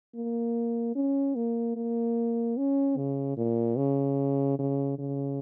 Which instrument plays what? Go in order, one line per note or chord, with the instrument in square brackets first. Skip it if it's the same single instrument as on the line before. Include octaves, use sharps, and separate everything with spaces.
[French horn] A#3
C#4
A#3
A#3
C#4
C#3
A#2
C#3
C#3
C#3